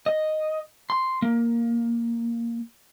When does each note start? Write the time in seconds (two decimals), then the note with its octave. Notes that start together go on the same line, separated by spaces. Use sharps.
0.06 D#5
0.90 C6
1.22 A#3